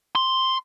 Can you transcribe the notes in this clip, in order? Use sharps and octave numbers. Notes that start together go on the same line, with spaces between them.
C6